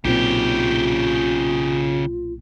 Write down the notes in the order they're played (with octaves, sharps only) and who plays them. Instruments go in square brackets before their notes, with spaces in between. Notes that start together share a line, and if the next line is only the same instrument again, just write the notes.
[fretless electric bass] B1 A#2 C4 [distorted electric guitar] C#3 G4 [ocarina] F4